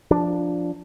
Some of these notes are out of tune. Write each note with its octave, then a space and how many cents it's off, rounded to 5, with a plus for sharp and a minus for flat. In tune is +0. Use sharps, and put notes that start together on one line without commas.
F3 +0 D4 -5